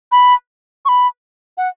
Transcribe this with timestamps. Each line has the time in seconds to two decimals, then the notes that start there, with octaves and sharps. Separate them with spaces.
0.12 B5
0.85 C#6
0.89 B5
1.58 F#5